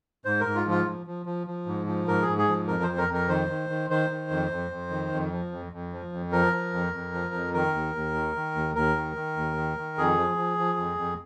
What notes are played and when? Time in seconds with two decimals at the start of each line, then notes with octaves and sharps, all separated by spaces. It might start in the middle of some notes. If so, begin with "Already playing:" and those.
0.25 G#2 C5
0.40 A#4
0.46 G#2
0.55 F4
0.66 F3 F4
0.85 F3
1.06 F3
1.26 F3
1.47 F3
1.66 G#2
1.86 F3
2.07 G#2 A#4
2.22 G#4
2.27 G#2
2.38 G#4
2.48 F3
2.68 F2 A#4
2.83 F2 C5
2.98 A#4
3.08 F2
3.13 A#4
3.29 D#3 C5
3.49 D#3
3.69 D#3
3.90 D#3 C5
4.10 D#3
4.31 F2
4.51 F2
4.71 F2
4.90 D#3
5.12 F2
5.32 F3
5.52 F2
5.72 F2
5.92 F3
6.12 F2
6.32 F3 A#4
6.53 F3
6.73 F2
6.93 F2
7.14 F3
7.34 F2
7.54 D#3 A#4
7.74 D#2
7.95 D#2
8.14 D#3
8.36 D#3
8.55 D#2
8.75 D#2 A#4
8.96 D#3
9.16 D#3
9.36 D#2
9.57 D#3
9.77 D#3
9.98 F2 G#4
10.17 F3
10.37 F3
10.58 F3
10.78 F2
10.98 F2